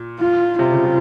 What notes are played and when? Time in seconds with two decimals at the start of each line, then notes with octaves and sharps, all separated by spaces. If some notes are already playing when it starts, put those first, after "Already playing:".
Already playing: A#2
0.20 F4
0.59 C3 F4
0.72 C#3
0.85 C3